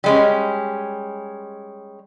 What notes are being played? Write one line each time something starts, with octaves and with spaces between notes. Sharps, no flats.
G3 G#3 C#4